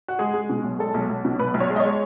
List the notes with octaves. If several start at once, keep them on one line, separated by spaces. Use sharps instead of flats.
F#4
G#3 G#4
G#3
B2
B1
G#3 A4
B1
B1
B2
B1 B4
B1
C#5
G#3
D#5
C#5
G#3